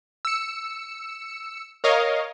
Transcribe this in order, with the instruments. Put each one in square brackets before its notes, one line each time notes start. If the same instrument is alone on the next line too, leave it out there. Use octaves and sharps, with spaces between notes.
[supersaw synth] E6 C#7
A#4 C#5 D#5 F5